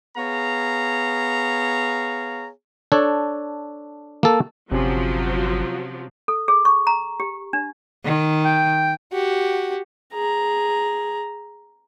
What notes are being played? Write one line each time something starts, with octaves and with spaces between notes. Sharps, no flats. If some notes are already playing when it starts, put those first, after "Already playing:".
B3 G#4 C#5 F5 A#5
D4 A4 C#5
A#3 A4
G1 C3 F3 F#3 C#4
A4
G#4
C#6
A#5
G4
D4
D#3
G5
F#4 G4
G#4 A#5